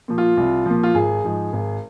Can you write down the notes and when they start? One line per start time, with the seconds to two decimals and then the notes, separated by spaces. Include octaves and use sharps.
0.08 A#2 F3
0.18 F4
0.37 C2
0.66 A#2 F3
0.83 F4
0.95 G#1 G#4
1.24 G#2 F3
1.53 G#1